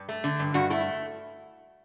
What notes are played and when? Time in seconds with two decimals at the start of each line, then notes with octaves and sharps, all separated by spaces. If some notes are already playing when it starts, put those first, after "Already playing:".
Already playing: G2
0.09 A3
0.24 D3
0.39 G2
0.54 G2 F#4
0.70 A3 E4